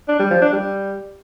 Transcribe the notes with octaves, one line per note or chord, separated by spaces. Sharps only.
D4
G3
F3
D4
G3